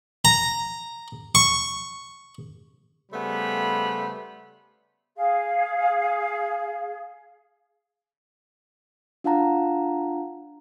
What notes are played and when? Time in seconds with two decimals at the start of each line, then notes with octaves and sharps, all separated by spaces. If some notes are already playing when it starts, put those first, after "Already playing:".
0.25 A#5
1.35 C#6
3.12 C#3 G3 A3 B3 C5 B5
5.16 G#4 F5
9.24 D4 F4 F5 F#5 A5 A#5